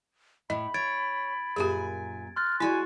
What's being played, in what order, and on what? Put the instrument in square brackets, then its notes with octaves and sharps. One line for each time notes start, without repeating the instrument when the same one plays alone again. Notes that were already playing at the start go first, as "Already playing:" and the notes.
[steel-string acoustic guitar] A2 [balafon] D#5 [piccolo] B5
[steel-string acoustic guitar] C#5 [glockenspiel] G#6 A6 D7
[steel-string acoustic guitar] F#2 A#2 G#5 [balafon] G4 G#4
[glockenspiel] C6 F#6 A6 [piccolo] F6
[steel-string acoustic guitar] G#3 F#4 [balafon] E4 D5 [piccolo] G#5